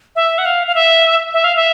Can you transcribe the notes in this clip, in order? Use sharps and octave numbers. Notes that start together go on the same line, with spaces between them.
E5
F#5
F5
F5
E5
E5
F5
E5